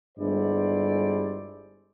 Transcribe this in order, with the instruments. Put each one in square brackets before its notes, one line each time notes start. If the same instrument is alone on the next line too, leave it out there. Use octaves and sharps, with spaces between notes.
[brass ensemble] G1 G2 G#3 E4 C5 D5